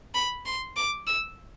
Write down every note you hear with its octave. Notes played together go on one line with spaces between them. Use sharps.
B5
C6
D6
E6